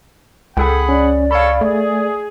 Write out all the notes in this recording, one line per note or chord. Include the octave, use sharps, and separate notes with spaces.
C#2 G#4 A4 F#5 G5 B5
C#4 D5
C#4 A4 C#5 F5 B5
A3 G#4